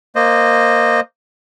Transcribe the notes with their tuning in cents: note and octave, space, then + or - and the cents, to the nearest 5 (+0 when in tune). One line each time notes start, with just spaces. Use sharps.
A#3 +0 C5 +0 D#5 -15